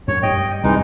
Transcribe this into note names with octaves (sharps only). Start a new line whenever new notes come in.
F#2 C#5
G2 D#5 G5
C2 E3 G#3 D#4